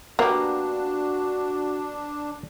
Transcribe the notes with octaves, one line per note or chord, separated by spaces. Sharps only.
A#3 B3 D4 F#4 G4